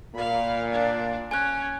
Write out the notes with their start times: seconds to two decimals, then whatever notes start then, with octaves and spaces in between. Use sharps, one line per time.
0.15 A#2 F5 B5
0.72 D4
1.31 C#4 G#5 F#6